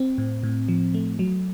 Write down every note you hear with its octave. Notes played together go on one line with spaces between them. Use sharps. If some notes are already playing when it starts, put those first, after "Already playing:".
Already playing: C4
A2
A2
F3
A3
F#3